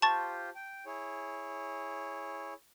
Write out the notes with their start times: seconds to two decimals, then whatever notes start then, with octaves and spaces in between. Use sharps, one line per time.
0.02 F4 G4 C5 A5 C#6 A6
0.55 G5
0.86 E4 G#4 C#5